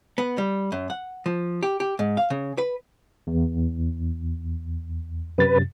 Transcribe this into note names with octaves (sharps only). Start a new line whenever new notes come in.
B3
G3
F#2
F#5
F3
G4
G4
G#2
F5
C#3
B4
E2
F#2 C3 B4 A6